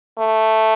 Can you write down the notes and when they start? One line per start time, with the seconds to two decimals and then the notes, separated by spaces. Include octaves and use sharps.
0.19 A3